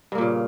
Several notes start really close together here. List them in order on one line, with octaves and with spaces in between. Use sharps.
G2 A#3 A#2 C#3